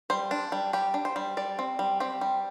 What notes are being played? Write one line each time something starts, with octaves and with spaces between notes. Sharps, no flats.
G3 C5
D4
G3
G3 G4
D4
C5
G3
G3 D5
C4
G3
C4 G4
G3